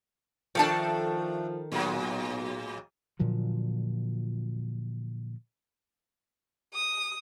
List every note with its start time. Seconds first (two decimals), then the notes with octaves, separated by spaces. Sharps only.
0.55 D#3 F3 A3 D4 A4 A5
1.72 B1 A2 F#3 G#3
3.19 A#2 D3 F3 F#3
6.74 D#6